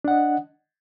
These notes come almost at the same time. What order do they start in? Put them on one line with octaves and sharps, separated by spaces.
D4 F#5 D#5